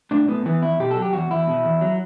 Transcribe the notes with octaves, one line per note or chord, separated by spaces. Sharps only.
A2 D4
A2 B3
E3 B3
E2 E4
B2 G4
A4
F#3
G4
E2 F#4
E2 E4
B2
E2
F#3